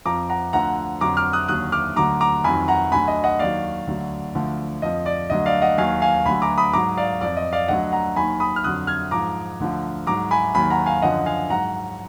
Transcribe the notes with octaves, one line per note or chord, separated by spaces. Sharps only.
F2 F3 A#5 D6
F#5 A#5
D2 D3 F3 F#5 A#5
F2 D3 F#3 A#5 D6
D6 F6
D#6 F#6
D#2 D3 F#3 D#6 F#6
D6 F6
D2 D3 F#3 A#5 D6
A#5 D6
F2 D#3 F#3 G#5 B5
F#5 A#5
D2 D3 F#3 G#5 B5
D#5
D#5 F#5
D#2 D#3 F#3 D5 F5
D2 D3 F#3
D2 D3 F3
F2 F3 D#5
D5
D2 D3 F#3 D#5
D5 F5
D#5 F#5
D#2 D#3 F#3 F5 G#5
F5 G#5
D2 D3 F#3 G#5 B5
A#5 D6
B5 D#6
G#2 F#3 A#5 D6
D5 F5
F2 F3 D5
D#5
D5 F5
D2 D3 F#3 D#5 F#5
F#5 A#5
D#2 D#3 F#3 G#5 B5
B5 D#6
F6
F2 D3 F#3 D#6 F#6
F6 G#6
G#2 F3 A#5 D6
D2 D3 F3
G#2 F#3 A#5 D6
G#5 B5
D#2 D#3 F#3 G#5 B5
F#5 A#5
F5 G#5
F#2 D3 F3 D#5 F#5
F5 G#5
G#2 F#3 F#5 A#5